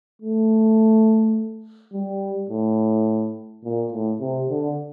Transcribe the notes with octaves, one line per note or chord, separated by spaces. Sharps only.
A3
G3
A2
A#2
A2
C3
D3